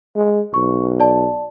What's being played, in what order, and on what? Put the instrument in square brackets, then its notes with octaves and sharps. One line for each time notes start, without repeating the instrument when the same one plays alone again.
[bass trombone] G#3
[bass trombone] B1 [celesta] C#6
[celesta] D5 A5